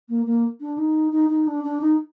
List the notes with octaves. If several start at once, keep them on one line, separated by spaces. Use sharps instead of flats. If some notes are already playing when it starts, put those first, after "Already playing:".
A#3
A#3
D4
D#4
D#4
D#4
D4
D4
D#4